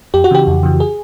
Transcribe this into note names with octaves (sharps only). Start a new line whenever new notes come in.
F2 G4
F#4
C#3 E3 G4
F2
C#3 E3
G#4